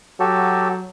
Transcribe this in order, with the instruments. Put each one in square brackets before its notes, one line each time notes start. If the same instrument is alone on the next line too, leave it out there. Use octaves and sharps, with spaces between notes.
[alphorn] F#3 [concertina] F#4 G4 A4